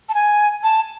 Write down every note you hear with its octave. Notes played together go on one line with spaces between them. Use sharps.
A5
G#5
A5